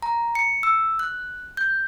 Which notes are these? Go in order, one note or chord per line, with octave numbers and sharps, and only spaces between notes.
A#5
C#7
E6
F#6
G6